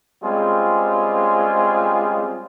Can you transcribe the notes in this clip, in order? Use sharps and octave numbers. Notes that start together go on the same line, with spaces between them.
G3 G#3 C4 C#4 F4 G#4